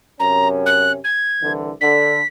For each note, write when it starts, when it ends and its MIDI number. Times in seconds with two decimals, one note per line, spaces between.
0.20 0.99 42
0.20 0.99 48
0.20 0.99 61
0.20 0.48 82
0.66 0.92 90
1.04 1.52 92
1.41 1.70 36
1.41 1.70 50
1.41 1.70 52
1.81 2.19 50
1.81 2.27 95